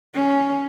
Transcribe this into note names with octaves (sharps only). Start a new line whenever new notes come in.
C#4